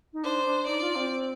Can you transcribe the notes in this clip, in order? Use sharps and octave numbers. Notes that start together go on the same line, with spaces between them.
D#4
D4 C5
D4
D#4 D5
F4
C4